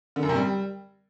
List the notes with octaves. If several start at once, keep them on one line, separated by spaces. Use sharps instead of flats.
D3
F#2
C3
G3